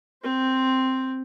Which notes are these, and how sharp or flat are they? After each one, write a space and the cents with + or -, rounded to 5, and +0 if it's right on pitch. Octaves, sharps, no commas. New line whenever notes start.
C4 +0 C5 +0